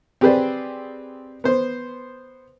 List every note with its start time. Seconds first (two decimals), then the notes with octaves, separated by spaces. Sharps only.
0.21 C4 G4 G#4 B4 C5 D5
1.44 B3 C5